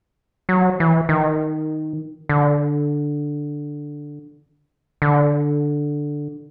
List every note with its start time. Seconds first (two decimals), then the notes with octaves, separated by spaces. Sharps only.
0.49 F#3
0.80 E3
1.09 D#3
2.29 D3
5.02 D3